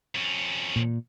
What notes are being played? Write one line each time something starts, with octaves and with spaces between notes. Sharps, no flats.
F2 C#4
A#2